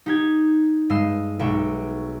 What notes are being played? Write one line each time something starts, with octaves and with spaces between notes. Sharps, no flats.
D#4 G4 G#6
G2 G#3 D#5 E6 C7
B1 G#3 E5 G5 C#6